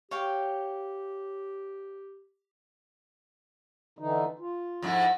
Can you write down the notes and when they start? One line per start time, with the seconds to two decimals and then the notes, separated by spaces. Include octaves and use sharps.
0.11 G4 C#5 F5 G5
3.99 D3 E3 D#4
4.39 F4
4.82 F2 G#2 E4